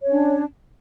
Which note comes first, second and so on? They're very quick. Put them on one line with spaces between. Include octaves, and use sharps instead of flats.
C#5 C#4 D4